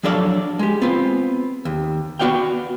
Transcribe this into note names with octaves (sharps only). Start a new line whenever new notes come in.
F3 F#3 D4 A4 D5 F5
G#3 G4
B3 C4 F4
D#2
B3 F#4 D5 F5 G5